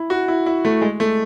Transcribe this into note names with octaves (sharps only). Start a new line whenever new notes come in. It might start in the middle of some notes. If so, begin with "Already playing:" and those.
Already playing: E4
F#4
E4
E4
A3
G#3
A3